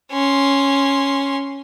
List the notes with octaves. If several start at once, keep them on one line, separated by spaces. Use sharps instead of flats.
C#4 C6